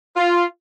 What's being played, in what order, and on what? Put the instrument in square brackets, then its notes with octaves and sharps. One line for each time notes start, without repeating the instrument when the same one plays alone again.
[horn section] F4